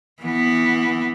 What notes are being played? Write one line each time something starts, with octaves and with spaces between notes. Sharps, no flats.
E3 B3